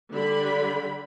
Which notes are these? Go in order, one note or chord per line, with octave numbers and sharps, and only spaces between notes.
D3 G3 B5